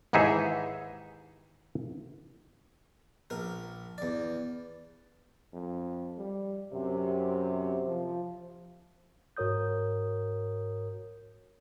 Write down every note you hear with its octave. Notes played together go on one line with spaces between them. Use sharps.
D#2 G#2 E3 D#4 G#4 E5
A#1 A#4
E2 D5
F2
G3
F#2 C3
F3
G#2 F#4 A#4 C#5 D#6 G6